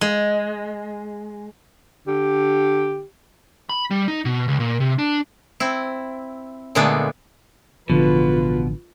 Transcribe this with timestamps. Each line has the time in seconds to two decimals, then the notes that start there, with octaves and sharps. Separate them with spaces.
0.01 G#3
2.06 D3 G4
3.69 B5
3.91 G3
4.08 D#4
4.25 B2
4.48 C#2
4.60 A#2
4.80 C3
4.99 D4
5.60 C4 E4
6.75 A#2 D3 G#3 A3 B3 D4
7.90 A1 B2 D3 F3 F4 B4